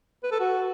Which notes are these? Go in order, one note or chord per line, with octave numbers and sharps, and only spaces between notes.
B4
A4
F#4